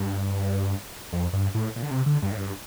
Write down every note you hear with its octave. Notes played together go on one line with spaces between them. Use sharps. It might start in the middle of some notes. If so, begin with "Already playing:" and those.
Already playing: G2
F2
G2
A2
A#2
D3
C3
D3
G2
A2
G2